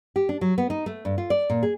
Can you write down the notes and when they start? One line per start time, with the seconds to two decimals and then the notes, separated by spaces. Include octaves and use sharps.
0.16 G4
0.29 D4
0.41 F#3
0.58 B3
0.70 D#4
0.86 A3
1.05 G2
1.18 F4
1.30 D5
1.50 A#2
1.63 G#4